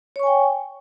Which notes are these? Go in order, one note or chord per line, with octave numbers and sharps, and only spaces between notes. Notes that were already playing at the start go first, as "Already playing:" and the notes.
C#5 G5 G#5 C#6